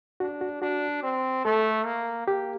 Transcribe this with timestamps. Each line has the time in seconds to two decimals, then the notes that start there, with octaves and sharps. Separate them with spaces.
0.20 D4 F#4
0.41 F#4
0.62 D4 F#4
1.03 C4
1.45 A3 A4
1.85 A#3
2.27 A#3 G4